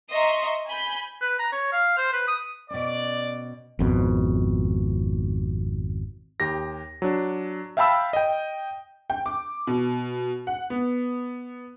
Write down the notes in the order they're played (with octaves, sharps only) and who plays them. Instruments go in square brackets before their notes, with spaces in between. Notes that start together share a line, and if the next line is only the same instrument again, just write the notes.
[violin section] D#5 E5 A#5 C6 C#6
G#5 B5 G6
[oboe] B4
A#5
C#5
F5
C5
B4
D#6
[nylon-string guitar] B2 C#4 [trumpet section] D5
[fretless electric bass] G#1 F2 B2
[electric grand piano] D#2 G4 A#6
F#3 D4
E5 F5 G5 A5 B5 E6
D#5 G5
[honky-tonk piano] G5
D6
B2
F#5
B3